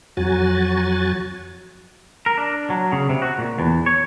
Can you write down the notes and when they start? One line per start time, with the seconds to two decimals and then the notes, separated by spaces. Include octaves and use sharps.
0.17 F2 F#3 F#4 G#5 A6
2.26 A#4
2.38 D4
2.70 F#3
2.92 C#3
3.09 C3
3.22 F#4
3.38 A#2
3.59 E2
3.86 C#5